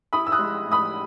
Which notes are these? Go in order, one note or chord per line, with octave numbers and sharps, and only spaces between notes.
E4 B5 D#6
E6
D#6 F#6
G#3
A2
B5 D#6